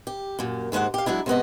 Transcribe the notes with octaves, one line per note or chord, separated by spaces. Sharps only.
G4
F#2 A#2
D#2 G#2 G#3 C5 F#5
G4 F5
F#3 G#3 D4 E4
C3 G#3 B3 D#5